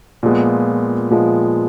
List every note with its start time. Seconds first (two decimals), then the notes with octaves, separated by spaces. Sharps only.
0.23 A#2 F3 G#3 B3
1.10 A#2 F3 G#3 B3